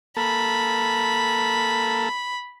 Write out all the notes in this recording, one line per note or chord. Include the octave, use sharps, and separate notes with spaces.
A#3 A4 B5